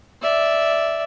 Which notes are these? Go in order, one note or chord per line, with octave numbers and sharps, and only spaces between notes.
D5 E5